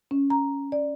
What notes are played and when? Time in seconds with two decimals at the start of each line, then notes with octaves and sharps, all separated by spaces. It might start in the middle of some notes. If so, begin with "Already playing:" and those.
0.11 C#4
0.30 A#5
0.72 D5